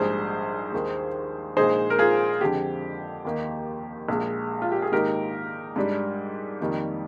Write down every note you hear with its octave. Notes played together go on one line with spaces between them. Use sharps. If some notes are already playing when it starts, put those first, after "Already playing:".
Already playing: A#1 G#2 G3 G#4 C5
D#2 D#3 G#3
A#1 A#2 G#3 D#4 G#4 C5
A#4
F4 G#4
F2 D3 G#3 G4
D#2 D#3 A#3 D#4
A#1 A#2 G#3
F4
G4
G#4
G#2 D#3 A#3 D#4 G4 A#4
G#2 G3 D4
F2 D#3 G3 A#3 D#4